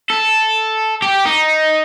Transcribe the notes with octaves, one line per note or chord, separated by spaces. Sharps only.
A4
G4
D#4